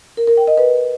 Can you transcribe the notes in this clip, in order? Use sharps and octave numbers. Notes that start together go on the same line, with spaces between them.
A#4
A#4
G5
D#5
B4